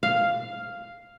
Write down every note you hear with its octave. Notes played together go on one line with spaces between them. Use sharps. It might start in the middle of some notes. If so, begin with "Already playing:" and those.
F5